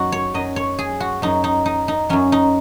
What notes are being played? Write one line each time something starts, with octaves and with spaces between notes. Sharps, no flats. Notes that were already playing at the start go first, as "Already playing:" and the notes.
Already playing: F#2 F#3 D#4 F#4
C#5
F#2 F#3 D#5
C#5
G#4
F#4
F#2 F#3 D#4
D#4
D#4
D#4
F#2 F#3 C#4
D#4